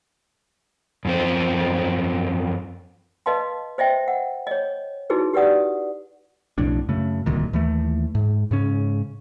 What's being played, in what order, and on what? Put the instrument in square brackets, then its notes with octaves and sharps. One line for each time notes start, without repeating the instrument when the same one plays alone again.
[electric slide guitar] F#2 F3 C4
[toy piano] B4 D#5 F5 A5 C6
C5 D#5 E5 G5
F#5
C#5 D#5
D#4 E4 F#4 G#4 A4 B4
G4 B4 D5 F#5 D#6
[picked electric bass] B1 F2 A2 D4
F#2 C#3 A3
D1 C2 A#2 D#3
D#2 E3 A3
G#2
G#2 C#3 C#4